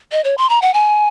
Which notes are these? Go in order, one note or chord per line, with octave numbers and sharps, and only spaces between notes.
D#5
C#5
C6
A#5
F#5
G#5